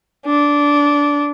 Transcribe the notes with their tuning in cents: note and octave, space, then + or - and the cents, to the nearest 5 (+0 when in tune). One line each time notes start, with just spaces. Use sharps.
D4 -15